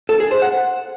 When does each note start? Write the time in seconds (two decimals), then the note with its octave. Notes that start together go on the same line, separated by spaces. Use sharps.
0.09 A4
0.20 G#4
0.31 C5
0.42 F#5